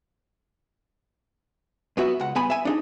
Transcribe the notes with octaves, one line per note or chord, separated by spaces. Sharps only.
F#2 B3 F#4 E5
C#2 F#5
G2 B3 G#5 B5
E5 G#5
D4 D#4 G#4